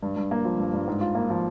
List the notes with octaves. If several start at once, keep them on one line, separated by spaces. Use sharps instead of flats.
G2
G2
A#3
F3
G2
G2
G#2
F4
A#3
F3